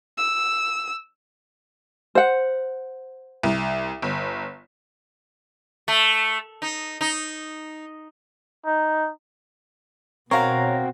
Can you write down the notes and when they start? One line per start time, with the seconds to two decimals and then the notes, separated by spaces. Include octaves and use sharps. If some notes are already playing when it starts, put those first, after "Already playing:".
0.18 E6
2.15 C5 F#5
3.43 C2
4.02 G1
5.88 A3
6.62 D#4
7.01 D#4
8.66 D#4
10.31 B2 C4 F#4 A#4 C#5 F5 A#5